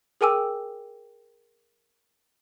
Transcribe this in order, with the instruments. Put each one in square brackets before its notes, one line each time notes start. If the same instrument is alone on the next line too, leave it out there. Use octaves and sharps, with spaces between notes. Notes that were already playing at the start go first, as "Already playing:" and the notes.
[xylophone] G#4 A#4 G5 G#5 D6 E6